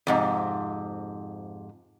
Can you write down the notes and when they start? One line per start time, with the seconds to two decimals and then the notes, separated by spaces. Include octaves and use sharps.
0.07 F2 G#2 C3